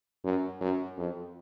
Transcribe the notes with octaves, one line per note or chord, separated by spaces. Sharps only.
F#2
F#2
F2